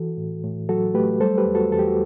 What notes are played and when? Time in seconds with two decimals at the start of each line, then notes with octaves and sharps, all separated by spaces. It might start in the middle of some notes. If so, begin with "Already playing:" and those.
Already playing: E3 F#4 A4
0.17 A2
0.44 A2
0.69 F#3 F#4 A4
0.94 A3 G4 B4
1.20 G3 A4 C5
1.38 G4 B4
1.46 E2
1.55 F#4 A4
1.72 E2 A4
1.79 G4
1.87 F#4